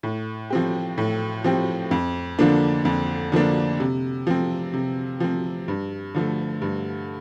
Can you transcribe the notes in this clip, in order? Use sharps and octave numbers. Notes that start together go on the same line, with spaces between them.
A2
F3 C4 G4
A2
F3 C4 G4
F2
D3 F3 A#3 D4
F2
D3 F3 A#3 D4
C3
F3 C4
C3
F3 C4
G2
D3 F3 A3
G2